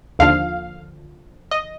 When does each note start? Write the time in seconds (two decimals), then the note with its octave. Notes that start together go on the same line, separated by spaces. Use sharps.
0.19 D#2 D3 F3 F5
1.51 D#5